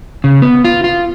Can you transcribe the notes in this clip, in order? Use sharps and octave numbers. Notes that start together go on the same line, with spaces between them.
C#3
B3
F4
F4